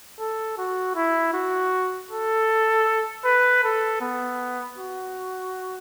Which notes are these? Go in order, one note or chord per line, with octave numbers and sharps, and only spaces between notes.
A4
F#4
E4
F#4
A4
B4
A4
B3
F#4